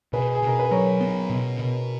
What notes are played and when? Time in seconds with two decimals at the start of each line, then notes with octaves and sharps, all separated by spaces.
0.13 B2 G#4 B4
0.35 G#4
0.42 B2 A#4
0.59 B4
0.71 F#3 A#4 C#5
1.00 B3
1.30 B2
1.59 B2